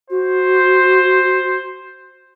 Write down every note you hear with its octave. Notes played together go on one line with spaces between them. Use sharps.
F#4 C5